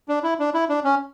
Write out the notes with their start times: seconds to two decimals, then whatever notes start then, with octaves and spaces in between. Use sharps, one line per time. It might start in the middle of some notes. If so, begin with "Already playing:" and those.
0.09 D4
0.23 E4
0.39 D4
0.54 E4
0.69 D4
0.84 C#4